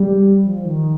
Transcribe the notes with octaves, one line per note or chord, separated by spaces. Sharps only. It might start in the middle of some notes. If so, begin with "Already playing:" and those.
Already playing: G3
F3
D#3